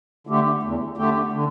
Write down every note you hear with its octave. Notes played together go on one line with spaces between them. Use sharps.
D3 A3 G4
E2
D3 A3 G4
D3